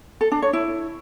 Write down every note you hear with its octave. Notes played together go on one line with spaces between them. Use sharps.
A4
D4
C#5
E4